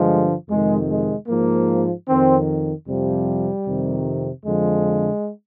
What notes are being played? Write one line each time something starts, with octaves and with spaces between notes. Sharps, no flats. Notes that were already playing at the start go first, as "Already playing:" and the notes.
Already playing: G2 D3 F3 G#3
F2 C3 D#3 G#3
G#3
G#2 F3 A#3
F2 D#3 C4
F2 C3 F3 G3
F2 C3 D#3
F2 D3 F3 G#3